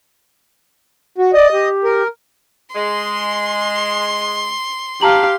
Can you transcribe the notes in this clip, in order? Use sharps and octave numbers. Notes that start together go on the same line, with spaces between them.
F#4
D5 D#5
G4
A#4
G#3 C6
G4 F5 A5 A#5 F#7